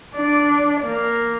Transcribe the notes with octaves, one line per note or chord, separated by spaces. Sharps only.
D4 D5
A#3